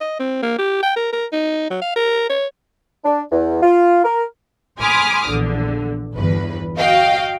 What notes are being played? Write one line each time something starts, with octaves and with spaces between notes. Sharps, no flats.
D#5
C4
A#3
G4
G5
A#4
A#4
D#4
F#3
F5
A#4
C#5
D4
E2
F4
A#4
G#5 B5 C6 D6 D#6 F6
A#1 E2 D3
G1 E2 B4
F#4 D#5 F5 G5